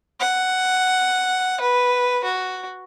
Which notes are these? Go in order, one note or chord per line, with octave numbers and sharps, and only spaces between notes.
F#5
B4
F#4